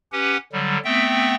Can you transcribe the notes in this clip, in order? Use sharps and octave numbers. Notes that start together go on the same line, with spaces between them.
C#4 G4 B4 F#5
D3 F#3 G3
A3 B3 C4 E5 G5